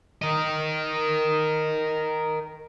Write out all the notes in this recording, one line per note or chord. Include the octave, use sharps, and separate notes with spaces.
A#4 D#5